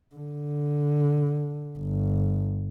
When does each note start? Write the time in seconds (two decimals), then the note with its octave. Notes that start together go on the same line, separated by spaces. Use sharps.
0.15 D3
1.78 G1